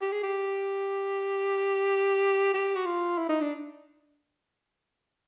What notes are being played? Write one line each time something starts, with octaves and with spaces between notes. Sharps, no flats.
G4
G#4
G4
G4
F#4
F4
E4
D#4
D4